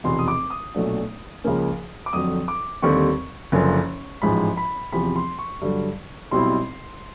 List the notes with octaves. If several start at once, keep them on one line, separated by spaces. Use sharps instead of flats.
F1 E2 B2 C6
D#6
D6
D#6
B1 A#2 F#3 A3 D4
C#2 C#3 F3 A#3 C#4
D6
F2 D3 F#3 D#6
D6
D#2 D3 G3 C4 C#6
F#1 F#2 D3 F3
A1 G#2 F3 G#3 B5
B5
E2 C3 F3 B5
C6
C#6
G2 D3 F#3
B1 B2 G3 C4 E4 C6